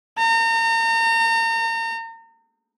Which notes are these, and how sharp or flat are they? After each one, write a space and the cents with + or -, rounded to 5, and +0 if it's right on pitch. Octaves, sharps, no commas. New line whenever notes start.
A#5 -35